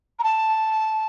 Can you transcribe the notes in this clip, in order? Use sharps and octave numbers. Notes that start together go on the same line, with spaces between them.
A#5
A5